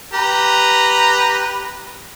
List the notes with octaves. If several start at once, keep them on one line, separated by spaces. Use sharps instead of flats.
G4 B4 A#5